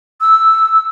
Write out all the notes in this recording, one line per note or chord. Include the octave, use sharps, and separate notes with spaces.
E6